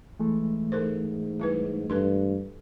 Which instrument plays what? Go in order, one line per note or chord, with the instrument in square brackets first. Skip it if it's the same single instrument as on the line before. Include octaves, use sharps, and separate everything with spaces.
[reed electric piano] E3 G#3 A3
[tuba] G#2 [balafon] A4 A#4 C5
[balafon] G3 E4 B4
[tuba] G2 [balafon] A4 B4 C6